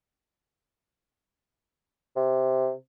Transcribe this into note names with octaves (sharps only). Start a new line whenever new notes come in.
C3